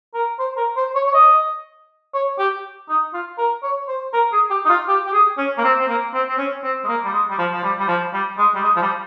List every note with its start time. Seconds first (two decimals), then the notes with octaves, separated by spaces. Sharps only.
0.14 A#4
0.39 C5
0.57 A#4
0.77 C5
0.95 C#5
1.07 C#5
1.14 D#5
2.14 C#5
2.39 G4
2.89 D#4
3.14 F4
3.38 A#4
3.63 C#5
3.88 C5
4.13 A#4
4.32 G#4
4.51 G4
4.65 D#4
4.69 F4
4.89 G4
5.07 G4
5.13 G#4
5.38 C#4
5.58 A#3
5.64 C4
5.80 C4
5.88 A#3
6.14 C4
6.29 C4
6.38 C#4
6.64 C4
6.84 G#3
6.88 A#3
7.05 G3
7.13 G#3
7.30 G3
7.38 F3
7.53 F3
7.63 G3
7.79 G3
7.88 F3
8.13 G3
8.38 G#3
8.55 G3
8.63 G#3
8.76 F3
8.82 G3